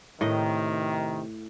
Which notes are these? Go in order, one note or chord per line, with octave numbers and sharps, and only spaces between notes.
A2 C3 D#3 D#5